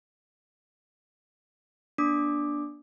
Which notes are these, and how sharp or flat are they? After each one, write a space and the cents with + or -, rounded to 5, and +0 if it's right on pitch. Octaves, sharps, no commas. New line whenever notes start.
B3 -45 D4 +0 D6 +10